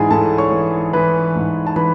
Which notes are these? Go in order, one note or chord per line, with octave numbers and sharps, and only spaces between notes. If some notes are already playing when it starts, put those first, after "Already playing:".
Already playing: G#2 E3 D4 E4 G#4 D5 G#5
G#2 A4 A5
C#5 C#6
E3
E3 B4 B5
G#2
A5
E3 B4 B5